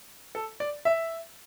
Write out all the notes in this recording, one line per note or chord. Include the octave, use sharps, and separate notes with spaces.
A4
D5
E5